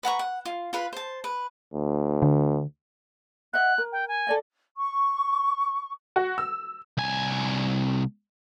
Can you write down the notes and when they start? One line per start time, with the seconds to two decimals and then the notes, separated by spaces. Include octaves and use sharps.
0.03 B4 F#5 A#5 C#6
0.19 F#5
0.45 F4
0.73 F4 B4 B5
0.93 C5 A5
1.24 B4
1.74 D2
2.22 D3
3.53 D#5 E5 F#5 F#6
3.78 A#4
3.92 G5
4.08 G#5
4.27 A4 D5 D#5
4.77 C#6
6.16 F#4
6.38 E6
6.98 C2 G#5